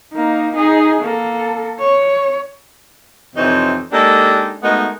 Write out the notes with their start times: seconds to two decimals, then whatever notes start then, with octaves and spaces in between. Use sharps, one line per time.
0.13 A#3 D#4
0.55 D#4 G#4
1.01 A#3 A4
1.79 C#5
3.36 F2 C3 E3 D#4 C5 C#5
3.92 G#3 A#3 D4 D#4 G4 A4
4.63 G#3 A3 B3 D#4 F#4 A#4